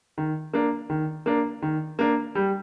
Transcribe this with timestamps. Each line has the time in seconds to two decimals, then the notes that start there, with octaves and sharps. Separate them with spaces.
0.18 D#3
0.53 A#3 D4
0.90 D#3
1.26 A#3 D4
1.62 D#3
1.99 A#3 D4
2.35 G3